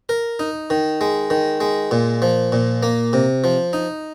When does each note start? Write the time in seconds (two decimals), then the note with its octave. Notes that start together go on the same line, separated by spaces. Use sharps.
0.09 A#4
0.39 D#4
0.70 D#3
1.01 G#3
1.30 D#3
1.61 G#3
1.91 A#2
2.22 F3
2.52 A#2
2.83 A#3
3.13 C3
3.44 F3
3.73 D#4